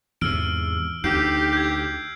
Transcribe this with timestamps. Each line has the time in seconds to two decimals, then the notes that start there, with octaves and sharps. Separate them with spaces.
0.21 E2 G#2 C3 E6 F6 D7
1.04 D2 D#4 G4 G6 C7 D7
1.53 G6 G#6